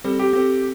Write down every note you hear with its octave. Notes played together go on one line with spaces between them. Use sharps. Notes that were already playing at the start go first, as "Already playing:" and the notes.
G3 C4 A4 C5
G4
C4 G4 A4 C5